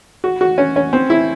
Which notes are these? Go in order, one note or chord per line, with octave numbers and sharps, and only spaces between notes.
F#4
F#4
C#4
C#4
C4
E4